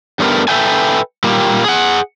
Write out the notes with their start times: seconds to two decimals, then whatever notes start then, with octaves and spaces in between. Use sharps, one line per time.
0.19 G2 G3 A3 B3 A#4
0.48 A4 B4 E5 G5 G#5
1.24 A#2 G3 A#3 G4
1.64 G#4 F#5